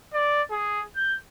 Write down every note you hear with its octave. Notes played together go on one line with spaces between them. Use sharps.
D5
G#4
G6